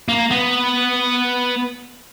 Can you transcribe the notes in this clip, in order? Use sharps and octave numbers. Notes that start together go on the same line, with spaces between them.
A#3
B3